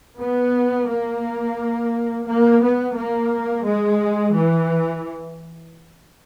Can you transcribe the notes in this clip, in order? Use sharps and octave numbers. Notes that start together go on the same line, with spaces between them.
B3
A#3
A#3
B3
A#3
G#3
E3